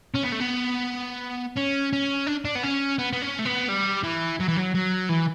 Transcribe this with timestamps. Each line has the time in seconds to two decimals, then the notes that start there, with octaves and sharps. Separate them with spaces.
0.15 C#4
0.24 B3
0.33 A3
0.41 B3
1.56 C#4
1.93 C#4
2.27 D4
2.45 D4
2.55 B3
2.63 C#4
2.99 B3
3.13 B3
3.22 C#4
3.39 A3
3.45 B3
3.69 G3
4.03 E3
4.40 F#3
4.48 E3
4.56 F#3
4.74 F#3
5.09 E3